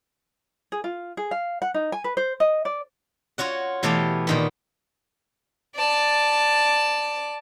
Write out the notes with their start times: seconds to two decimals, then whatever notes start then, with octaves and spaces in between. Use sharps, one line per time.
0.72 G#4
0.84 F4
1.17 G#4
1.31 F5
1.62 F#5
1.74 D#4
1.92 G#5
2.04 B4
2.17 C5
2.40 D#5
2.65 D5
3.38 F4 F#4 C#5 F#5
3.83 B2 E3 A3 G4 F5
4.27 A#2 D#3 B3
5.76 D5 A5